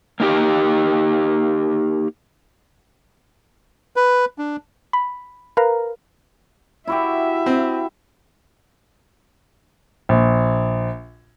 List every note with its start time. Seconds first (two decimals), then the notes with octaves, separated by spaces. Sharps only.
0.20 A#3 D#4 G4
3.96 B4
4.38 D4
4.93 B5
5.57 A#4 B4 F5 A#5
6.88 E4 F#4 G4 E5
7.46 C4
10.09 A#1